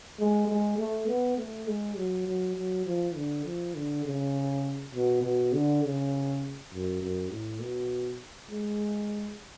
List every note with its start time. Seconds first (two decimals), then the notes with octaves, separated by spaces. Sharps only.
0.19 G#3
0.48 G#3
0.78 A3
1.07 B3
1.38 A3
1.67 G#3
1.97 F#3
2.27 F#3
2.56 F#3
2.86 F3
3.15 D3
3.45 F3
3.75 D3
4.05 C#3
4.94 B2
5.23 B2
5.53 D3
5.83 C#3
6.72 F#2
7.02 F#2
7.32 A2
7.61 B2
8.50 G#3